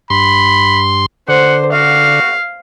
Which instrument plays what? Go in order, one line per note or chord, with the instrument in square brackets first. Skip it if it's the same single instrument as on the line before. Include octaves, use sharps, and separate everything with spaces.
[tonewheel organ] G2 C6 [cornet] B5
[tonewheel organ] D3 [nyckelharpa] C5 [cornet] F#5
[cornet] F#4 [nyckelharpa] F5